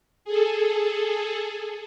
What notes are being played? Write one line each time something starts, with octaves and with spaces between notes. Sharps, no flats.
G#4 A4